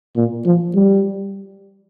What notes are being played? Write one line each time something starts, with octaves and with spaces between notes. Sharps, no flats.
A#2
F3
G3